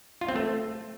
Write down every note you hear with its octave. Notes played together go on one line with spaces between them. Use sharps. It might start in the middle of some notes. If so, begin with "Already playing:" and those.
F4
C4
A3